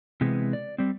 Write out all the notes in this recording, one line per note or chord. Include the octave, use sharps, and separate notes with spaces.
C3 E3 G#3 B3
D5
G3 C4